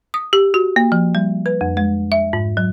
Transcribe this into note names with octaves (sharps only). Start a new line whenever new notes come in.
D#6
G4
F#4
A#3
F3
G3
B4
F2
G#3
E5
G#2
F#3